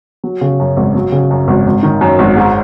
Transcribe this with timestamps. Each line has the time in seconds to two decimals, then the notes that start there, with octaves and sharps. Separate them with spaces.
0.24 F#3
0.41 C#3
0.60 F#2
0.77 G#1
0.95 F#3
1.12 C#3
1.31 F#2
1.48 G#1
1.66 G#1
1.83 D#3
2.01 F#2
2.19 G#1
2.36 G#2